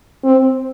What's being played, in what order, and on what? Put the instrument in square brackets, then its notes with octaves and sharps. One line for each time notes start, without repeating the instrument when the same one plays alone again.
[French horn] C4